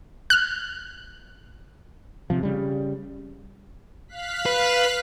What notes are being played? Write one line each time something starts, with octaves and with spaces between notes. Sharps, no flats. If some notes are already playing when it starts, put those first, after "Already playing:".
F6 F#6
C3 F3
C#3 G3
F5 F#6 B6
B4